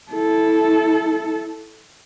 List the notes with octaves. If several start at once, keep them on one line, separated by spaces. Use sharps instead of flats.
E4 A4